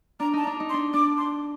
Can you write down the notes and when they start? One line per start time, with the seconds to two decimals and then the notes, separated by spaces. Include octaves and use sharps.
0.20 D4 A#5
0.33 D#4 A5
0.44 D4 A#5
0.60 D#4
0.69 C6
0.74 D4
0.93 D4 D6
1.18 C6